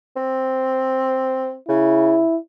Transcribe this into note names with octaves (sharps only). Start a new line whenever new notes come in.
C4
C#3 E4